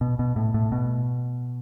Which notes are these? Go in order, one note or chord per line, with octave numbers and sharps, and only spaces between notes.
B2
B2
A2
A2
B2